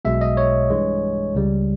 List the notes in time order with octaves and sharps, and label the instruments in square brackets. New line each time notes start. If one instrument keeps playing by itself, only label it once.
[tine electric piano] B1 B2 G#3 E5
D#5
C#5
G2 E3 G#3
C#2 C#3 G3